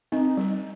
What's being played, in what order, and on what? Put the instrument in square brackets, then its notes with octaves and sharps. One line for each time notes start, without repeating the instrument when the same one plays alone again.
[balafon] C4 [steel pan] D#4
[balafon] G3